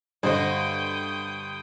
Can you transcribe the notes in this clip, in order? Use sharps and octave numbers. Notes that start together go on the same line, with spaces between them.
G2 D3 F#4 C5 D#5 G5 D#6